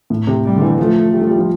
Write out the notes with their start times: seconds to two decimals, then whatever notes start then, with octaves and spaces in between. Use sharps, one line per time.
0.10 A2
0.27 C3
0.44 G3
0.56 D3
0.62 E3
0.78 F3 A3
1.13 G3
1.21 F3
1.30 G3
1.39 F3